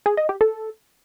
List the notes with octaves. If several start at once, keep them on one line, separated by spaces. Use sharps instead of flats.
G#4
D#5
G4
A4